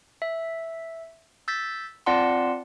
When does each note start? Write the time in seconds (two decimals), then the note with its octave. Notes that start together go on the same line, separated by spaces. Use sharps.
0.22 E5
1.48 E6 G6 A6 B6
2.06 C4 F4 D5 F#5 A5 C6